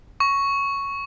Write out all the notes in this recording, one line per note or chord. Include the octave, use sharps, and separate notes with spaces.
C#6